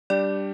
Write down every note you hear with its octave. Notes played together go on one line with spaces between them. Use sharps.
G3 D4 G4 D5